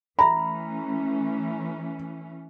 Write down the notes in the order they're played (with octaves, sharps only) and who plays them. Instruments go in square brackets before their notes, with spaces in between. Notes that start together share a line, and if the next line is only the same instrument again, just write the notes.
[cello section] E3 A3 C#4 [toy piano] E5 B5 [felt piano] A#5